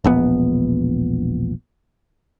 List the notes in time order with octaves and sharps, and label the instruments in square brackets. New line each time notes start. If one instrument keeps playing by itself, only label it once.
[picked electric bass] E1 A#1 B3